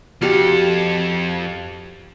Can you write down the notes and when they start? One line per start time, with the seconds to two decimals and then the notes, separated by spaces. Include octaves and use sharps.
0.22 F2 F#4 G4 A4 F5